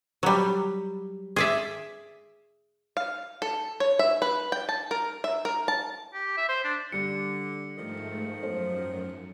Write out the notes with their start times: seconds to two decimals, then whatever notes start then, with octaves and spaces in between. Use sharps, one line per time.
0.23 F#3 G3
1.36 G#4 D5 E5
2.97 F5
3.42 A4
3.80 C#5
3.99 E5
4.22 B4
4.52 G5
4.69 A5
4.91 A#4
5.24 E5
5.45 A#4
5.68 A5
6.14 G4
6.37 E5
6.49 C5
6.64 D4
6.92 D3 G3 C#7
7.77 G#2 D#3 F3 A3
8.43 F#2 A4 C5